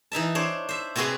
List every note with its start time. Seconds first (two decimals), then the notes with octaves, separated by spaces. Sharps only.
0.12 E3 D#4 E5 A5
0.35 D4 C5 C#5
0.69 C5 E5
0.96 C3 C4 F#4 G#4 B4 C6